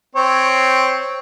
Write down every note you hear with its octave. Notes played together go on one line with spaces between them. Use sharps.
C4 C#5